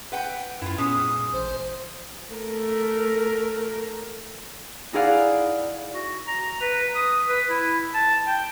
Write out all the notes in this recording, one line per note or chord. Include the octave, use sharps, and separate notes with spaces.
B4 F#5 G5
F#2 E4 F4
A#2 G#3 B3 C#4 D#6
A1 C5
A3 A#4
D#4 E4 G#4 D5 F5 F#5
F#4
A#5
B4
D#6
B4
E4
A5
G5